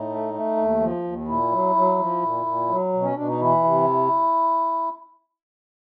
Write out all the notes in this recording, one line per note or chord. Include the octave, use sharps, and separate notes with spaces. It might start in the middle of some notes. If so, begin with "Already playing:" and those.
Already playing: A2 D#4
A3
A3
D#2
F3
D#2
A#2 E4
F#3
F#3
F3
A#2
A#2
F#3
B2
C#4
B2 D4
D#4
E3 E4
C3